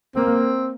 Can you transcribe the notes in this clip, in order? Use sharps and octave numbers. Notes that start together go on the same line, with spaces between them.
A#3 C4